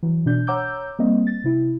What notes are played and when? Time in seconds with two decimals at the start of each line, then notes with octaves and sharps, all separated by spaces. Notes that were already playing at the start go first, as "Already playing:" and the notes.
0.03 E3 F#3
0.26 B2 D4 G6
0.47 C#5 F#5 A#5 D6 E6 G6
0.99 G3 A#3 C4 D#5
1.27 A6
1.44 C3 E4